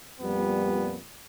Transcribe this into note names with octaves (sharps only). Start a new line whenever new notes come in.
F2 A#2 G3 B3